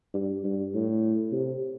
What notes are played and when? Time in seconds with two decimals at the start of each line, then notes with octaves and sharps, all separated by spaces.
0.14 G2
0.44 G2
0.74 A2
1.32 C3